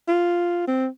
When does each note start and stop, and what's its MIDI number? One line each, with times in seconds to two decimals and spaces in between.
0.08 0.66 65
0.68 0.87 60